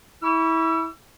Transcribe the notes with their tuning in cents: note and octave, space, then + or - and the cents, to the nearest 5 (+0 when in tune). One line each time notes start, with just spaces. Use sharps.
E4 -20 C#6 +35 E6 +30